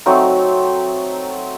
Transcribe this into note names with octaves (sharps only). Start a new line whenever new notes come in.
F#3 A3 C4 D#4